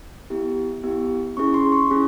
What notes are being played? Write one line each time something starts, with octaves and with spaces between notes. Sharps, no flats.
B3 E4 G4
B3 E4 G4
C#4 E4 G#4 C#6
C6
C#6
C#4 E4 G#4